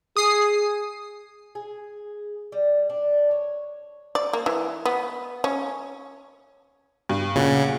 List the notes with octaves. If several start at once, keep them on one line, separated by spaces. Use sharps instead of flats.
G#4 D#6 C7
G#4
G3
D4
C#5
D5
A#3
E3
B3
C#4
G2
A#2 C#3 F#4 F#5